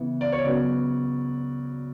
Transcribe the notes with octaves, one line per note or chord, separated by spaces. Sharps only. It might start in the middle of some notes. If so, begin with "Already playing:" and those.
Already playing: C#3 E3 B3
D5
C#5
C#3 F#3 B3 D5